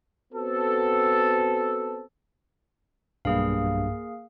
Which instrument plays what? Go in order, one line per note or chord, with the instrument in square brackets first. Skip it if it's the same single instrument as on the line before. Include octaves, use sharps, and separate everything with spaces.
[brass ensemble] B3 C4 F#4 A4
[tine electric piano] B1 G2 [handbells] A#3 G#4 F5